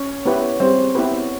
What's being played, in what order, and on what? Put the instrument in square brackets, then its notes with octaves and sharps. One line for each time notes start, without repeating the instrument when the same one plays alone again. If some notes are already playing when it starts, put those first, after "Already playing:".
Already playing: [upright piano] C#4 C#5
[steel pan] B3 E4 G4 B4
[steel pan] G3 [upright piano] C4 C5
[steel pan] B3 E4 G4 B4